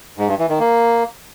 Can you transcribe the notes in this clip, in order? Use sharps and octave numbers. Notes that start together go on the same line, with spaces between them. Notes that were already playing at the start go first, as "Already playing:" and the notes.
G#2
G2
E3
D#3
A#3